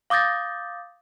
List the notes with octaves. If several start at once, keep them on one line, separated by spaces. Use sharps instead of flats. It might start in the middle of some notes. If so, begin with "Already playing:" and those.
F5 D6 D#6 G6 A6 A#6